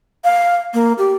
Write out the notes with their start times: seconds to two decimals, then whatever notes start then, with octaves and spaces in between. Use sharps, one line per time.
0.24 F5
0.74 A#3
0.98 G4